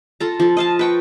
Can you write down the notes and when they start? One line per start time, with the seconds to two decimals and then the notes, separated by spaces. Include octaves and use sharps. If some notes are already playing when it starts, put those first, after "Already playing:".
0.20 F4 A4 A#5
0.40 F3 A4
0.57 D#5 F5 A5
0.79 B4 G5 C#6